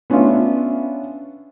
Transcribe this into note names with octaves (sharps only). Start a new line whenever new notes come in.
B3 C#4 D4 F4 E5